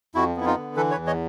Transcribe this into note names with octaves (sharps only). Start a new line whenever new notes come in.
F2 E4 F#4
B3 E4
D#4 F4
D3
E3 A4 B4
B4 C#5
E2
C#5 D#5